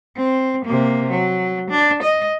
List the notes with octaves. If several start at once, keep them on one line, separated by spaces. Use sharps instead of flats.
C4
C3 A#3
F#3
D4
D#5